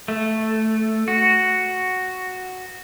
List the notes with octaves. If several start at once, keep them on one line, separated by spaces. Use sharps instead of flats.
A3
F#4